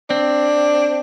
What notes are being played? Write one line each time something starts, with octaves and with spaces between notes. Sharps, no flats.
C4 D4